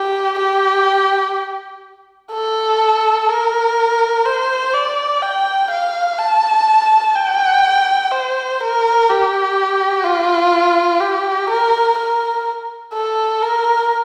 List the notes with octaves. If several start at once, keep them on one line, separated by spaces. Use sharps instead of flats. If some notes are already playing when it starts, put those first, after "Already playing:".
Already playing: G4
G4
A4
A#4
C5
D5
G5
F5
A5
G5
C5
A#4
G4
F4
G4
A#4
A#4
A4
A#4